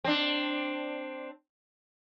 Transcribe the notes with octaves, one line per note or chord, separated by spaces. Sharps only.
C4 D4